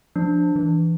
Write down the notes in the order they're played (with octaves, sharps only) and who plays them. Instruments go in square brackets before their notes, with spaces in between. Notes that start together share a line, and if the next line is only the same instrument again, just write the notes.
[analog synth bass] F3 [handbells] D4
[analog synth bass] E3